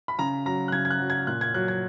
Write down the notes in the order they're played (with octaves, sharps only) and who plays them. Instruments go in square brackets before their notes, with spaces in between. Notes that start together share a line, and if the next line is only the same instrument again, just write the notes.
[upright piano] B5
C#3 A#5
F#3 A#5
F#6
C#3 G#6
G#6
F#6
F#3
G#6
A#2 F#6
G#6
F#3 F#6
G#6